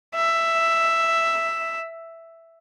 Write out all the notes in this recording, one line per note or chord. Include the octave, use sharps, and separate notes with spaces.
E5